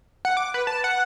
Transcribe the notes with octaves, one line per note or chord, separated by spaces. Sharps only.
F#5
D6
B4
A5
F#5